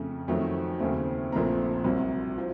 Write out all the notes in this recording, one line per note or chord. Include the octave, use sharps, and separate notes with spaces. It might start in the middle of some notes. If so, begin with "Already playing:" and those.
Already playing: F2 C#3 A3
F2 D#3 F#3 A3 C4
D#2 C#3 A3 C4
A#1 A#2 A3 C4 A#5
C2 C3 F#3
F3